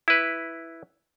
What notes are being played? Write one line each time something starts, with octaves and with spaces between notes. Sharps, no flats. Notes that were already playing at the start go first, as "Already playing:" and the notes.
E4 B4